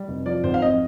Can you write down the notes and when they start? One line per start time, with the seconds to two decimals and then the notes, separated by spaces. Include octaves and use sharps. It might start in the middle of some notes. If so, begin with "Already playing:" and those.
Already playing: G3
0.08 F1
0.26 F3 D5
0.44 G#1 C5
0.54 F5
0.62 F2 D#5